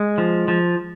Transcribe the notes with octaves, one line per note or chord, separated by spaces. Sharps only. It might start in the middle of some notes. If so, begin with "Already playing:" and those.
Already playing: G#3
F3
F3